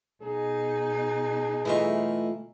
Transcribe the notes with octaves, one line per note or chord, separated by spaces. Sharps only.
B2 D#4 G#4
E3 A3 F4 D#5 E5 C#6